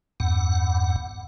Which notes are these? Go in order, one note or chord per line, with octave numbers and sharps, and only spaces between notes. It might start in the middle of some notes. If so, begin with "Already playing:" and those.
E2 G2 F#5